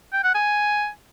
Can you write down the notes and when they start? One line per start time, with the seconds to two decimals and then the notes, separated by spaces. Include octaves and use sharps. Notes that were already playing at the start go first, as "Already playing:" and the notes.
0.13 G5
0.24 F#5
0.35 G#5